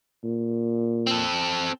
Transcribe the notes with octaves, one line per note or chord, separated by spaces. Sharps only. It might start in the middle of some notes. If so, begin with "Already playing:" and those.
A#2
C4 A4